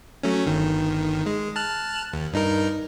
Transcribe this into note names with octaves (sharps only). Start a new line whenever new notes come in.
F#3 A3 C#4
G1 D#3
G#3
A5 F6 F#6
D#2
G2 D#4 A#4